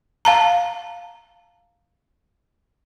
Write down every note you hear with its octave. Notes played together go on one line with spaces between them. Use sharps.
F5 A5 A#5